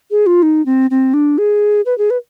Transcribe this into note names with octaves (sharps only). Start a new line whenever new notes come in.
G#4
F4
D#4
C4
C4
D4
G#4
B4
G#4
B4